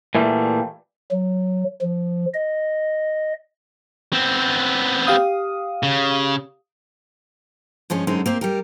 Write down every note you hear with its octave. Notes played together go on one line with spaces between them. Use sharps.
A#2 E3 G3 A3
F#3
F3
D#5
B3 C4
G4 F5 D#6
C#3
G2 F3 G#3 C#4
F#2 D3 G#3 C4 D#4
A#3 C4 G4
G3 G4 A#4